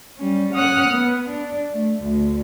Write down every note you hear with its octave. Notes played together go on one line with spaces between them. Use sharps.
G3 C#4
C#4 F#5 D#6 F6 F#6
B3
D4
A3
D2